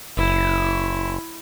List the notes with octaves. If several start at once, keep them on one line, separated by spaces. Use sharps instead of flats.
F#1 E4